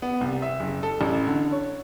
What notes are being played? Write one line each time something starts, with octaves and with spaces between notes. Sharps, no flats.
B3
C2
E5
F#1
A4
A1
D3
C#5